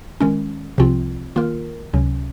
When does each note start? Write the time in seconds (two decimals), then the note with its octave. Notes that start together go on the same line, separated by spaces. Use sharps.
0.20 D#3 G#3 C#4
0.78 C2 C3 F3 C4 F4
1.36 D#3 A#3 F4 A#4
1.93 C#2 C3 F#3 C#4